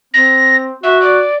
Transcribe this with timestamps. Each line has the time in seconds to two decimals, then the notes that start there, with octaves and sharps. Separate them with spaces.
0.14 C4 A#6
0.83 F#4 E5
1.01 D5